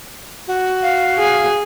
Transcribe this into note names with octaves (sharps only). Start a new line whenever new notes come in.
F#4
F5
G#4